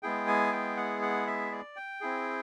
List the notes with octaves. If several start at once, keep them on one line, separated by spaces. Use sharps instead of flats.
G#3 B3 E4 G#4 G5
G#5
G5
F#5
F#5
E5
D5
G5
C4 E4 G#4